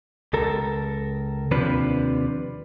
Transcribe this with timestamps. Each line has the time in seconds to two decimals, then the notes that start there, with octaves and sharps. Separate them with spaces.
0.33 C#2 A4 A#4
1.51 D#2 C3 F3 D4 B4